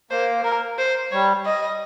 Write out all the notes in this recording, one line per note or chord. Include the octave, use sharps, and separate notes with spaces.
A#3 C5
A#4
C5
G3 C#5
D#5